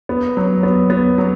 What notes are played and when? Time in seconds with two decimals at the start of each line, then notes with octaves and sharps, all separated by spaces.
0.09 B3
0.37 F#3
0.63 B3
0.90 B3
1.18 F#3